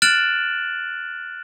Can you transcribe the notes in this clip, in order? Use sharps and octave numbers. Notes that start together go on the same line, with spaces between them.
F6 F#6 A6 D7 E7 F#7